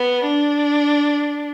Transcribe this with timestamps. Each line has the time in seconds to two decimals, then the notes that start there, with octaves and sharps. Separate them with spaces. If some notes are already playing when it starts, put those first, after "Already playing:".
Already playing: B3
0.25 D4